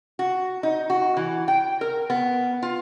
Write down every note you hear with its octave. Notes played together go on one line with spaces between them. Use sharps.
F#4
D#4
F#4
E3
G5
A#4
B3
F4